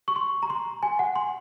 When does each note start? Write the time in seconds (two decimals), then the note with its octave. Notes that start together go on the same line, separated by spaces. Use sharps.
0.08 C#6
0.16 C6
0.43 A#5
0.50 C6
0.83 G#5
0.99 F#5
1.16 C6